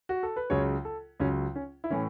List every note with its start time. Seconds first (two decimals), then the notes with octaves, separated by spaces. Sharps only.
0.09 F#4
0.23 A4
0.36 B4
0.50 C#2 C#3 F#3 C#5
0.85 A4
1.20 C#2 C#3 F#3 C#4
1.56 C#4
1.84 E4
1.90 A2 E3 C#4